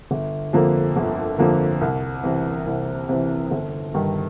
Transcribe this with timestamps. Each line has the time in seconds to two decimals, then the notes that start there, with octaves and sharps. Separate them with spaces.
0.11 G1
0.53 F2 D3 F3 A#3
0.96 G1
1.39 F2 D3 F3 A#3
1.81 C2
2.23 C3 E3
2.66 C2
3.09 C3 E3
3.51 G1
3.94 G2 D#3